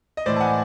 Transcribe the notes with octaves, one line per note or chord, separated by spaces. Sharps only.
D#5
A2 E3 C5 D5
A5
F#5 G#5